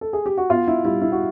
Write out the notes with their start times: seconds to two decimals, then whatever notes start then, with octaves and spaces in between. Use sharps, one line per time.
0.01 A4
0.13 G#4
0.26 G4
0.37 F#4
0.50 B3 F4
0.68 E4
0.85 G3 E4
1.02 E4
1.12 F#4